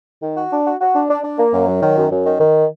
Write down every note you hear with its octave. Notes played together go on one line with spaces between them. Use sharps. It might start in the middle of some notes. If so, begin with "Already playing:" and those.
D#3
F#4
D4
F#4
F#4
D4
D4
D4
A#3
F#2
F#3
D#3
F#2
F#2
D#3
D#3